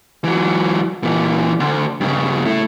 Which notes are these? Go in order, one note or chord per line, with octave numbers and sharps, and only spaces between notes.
E3 F#3
A#2 E3
D2
G2 C#3
A3 E4